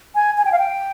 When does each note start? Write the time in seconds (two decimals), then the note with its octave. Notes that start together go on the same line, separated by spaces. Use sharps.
0.15 G#5
0.38 G#5
0.45 G5
0.52 F5
0.59 G5